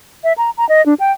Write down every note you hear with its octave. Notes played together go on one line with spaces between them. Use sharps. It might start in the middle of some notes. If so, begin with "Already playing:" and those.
E5
A#5
A#5
D#5
D4
G5